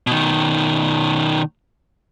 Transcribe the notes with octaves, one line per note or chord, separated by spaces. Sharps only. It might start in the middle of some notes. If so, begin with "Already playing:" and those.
B2 D#3